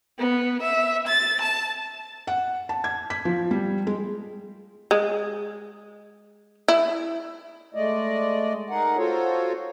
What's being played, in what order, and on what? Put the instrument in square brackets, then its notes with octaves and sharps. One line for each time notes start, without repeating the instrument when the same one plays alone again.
[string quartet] B3
E5
A6
A5
[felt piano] F#5
A5
G#6
B6
F3
G3
G#3
[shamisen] G#3
E4
[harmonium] G#3 A3 D5 D#5
D#4 G#4 A#4 F#5
F4 F#4 A4 C5 C#5